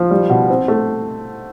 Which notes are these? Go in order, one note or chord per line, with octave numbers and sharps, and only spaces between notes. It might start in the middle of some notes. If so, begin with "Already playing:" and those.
Already playing: F3
G3
B2
C4
A3